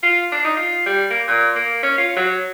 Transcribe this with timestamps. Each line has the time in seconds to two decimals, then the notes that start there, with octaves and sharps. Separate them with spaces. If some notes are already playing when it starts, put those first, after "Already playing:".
0.03 F4
0.32 D4
0.45 D#4
0.57 F4
0.86 G3
1.11 A#3
1.28 A#2
1.56 A#3
1.83 C#4
1.98 F4
2.17 F#3